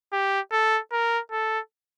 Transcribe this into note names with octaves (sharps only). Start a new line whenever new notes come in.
G4
A4
A#4
A4